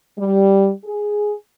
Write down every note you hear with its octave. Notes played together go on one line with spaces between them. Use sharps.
G3
G#4